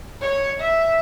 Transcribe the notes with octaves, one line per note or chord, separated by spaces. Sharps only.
C#5
E5